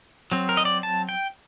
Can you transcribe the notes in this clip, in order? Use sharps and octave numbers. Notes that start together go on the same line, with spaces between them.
F#3 C4
A#4
D#5
D5
A5
G5